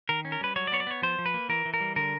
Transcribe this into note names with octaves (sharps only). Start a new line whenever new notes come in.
D#3 A#4
C#4
A#4
G3 B4
F#3 C#5
D5
B3 C#5
D5
B3 C#5
F3 C5
F3
B4
A#3
E3 A#4
E3
A#4
G3
D3 A#4